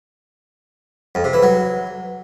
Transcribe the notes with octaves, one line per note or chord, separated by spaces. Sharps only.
F2
C3
E3
F#3